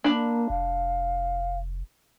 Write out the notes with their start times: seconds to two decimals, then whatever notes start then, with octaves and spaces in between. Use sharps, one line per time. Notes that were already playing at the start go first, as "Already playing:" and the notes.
0.04 A#3 D4 B5
0.50 F1 F5